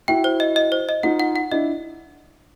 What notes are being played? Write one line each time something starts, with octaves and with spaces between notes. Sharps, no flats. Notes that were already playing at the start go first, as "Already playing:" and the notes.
E4 F#4 G5
C5
D#5
D#5
C5
D#5
D#4 F4 F#5
F#5
F#5
D4 E4 D#5